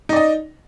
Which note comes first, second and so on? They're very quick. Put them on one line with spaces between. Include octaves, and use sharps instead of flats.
D#4 D5 D#5